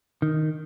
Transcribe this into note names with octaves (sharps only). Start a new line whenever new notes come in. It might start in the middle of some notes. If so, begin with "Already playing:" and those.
D#3